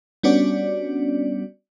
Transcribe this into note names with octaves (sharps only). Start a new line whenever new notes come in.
G3 B3 C#4 D4 F#4 D5